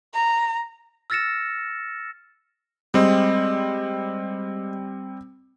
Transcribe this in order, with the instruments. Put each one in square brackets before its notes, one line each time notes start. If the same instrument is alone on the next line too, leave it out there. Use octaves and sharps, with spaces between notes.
[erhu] A#5
[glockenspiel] E6 F6 A6 A#6 C#7 E7
[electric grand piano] G3 C4 [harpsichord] G#3